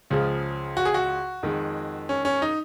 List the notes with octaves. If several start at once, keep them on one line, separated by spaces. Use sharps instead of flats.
C#2 C#3 F3 G#3
F#4
G#4
F#4
F2 D#3 G#3
C#4
C#4
D#4